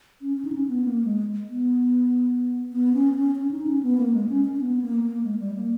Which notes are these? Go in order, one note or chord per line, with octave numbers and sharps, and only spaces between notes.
C#4
C#4
D#4
C#4
B3
A#3
G#3
B3
B3
C#4
C#4
C#4
D#4
C#4
B3
A#3
G#3
C#4
C#4
C#4
B3
A#3
A#3
G#3
G3
A#3